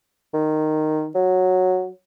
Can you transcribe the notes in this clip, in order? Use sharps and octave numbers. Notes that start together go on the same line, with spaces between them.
D#3
F#3